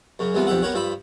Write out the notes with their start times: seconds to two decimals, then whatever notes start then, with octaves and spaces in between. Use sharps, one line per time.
0.19 F#2 C#3
0.34 C2 C3 E3 B3 F4
0.47 B1 F2 G4 E5 F#5
0.62 B3 G4 A#4 C#5 F#5
0.74 G2 F3 E5 B5